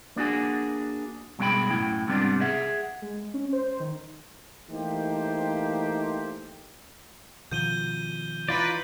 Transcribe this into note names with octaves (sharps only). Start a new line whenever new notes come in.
A#3 D4 F#4 G#4
G2 B2 G#3 D4 G5 B5
F#2 A2 E4 G5
G#2 C3 G3 B3 D4
G#4 E5 F#5
G#3
C#4
C5
D#3
E3 A3 A#3 D#4 G4 C5
B2 D#3 F3 G6 D#7 G7
E3 D#4 F4 B4 D5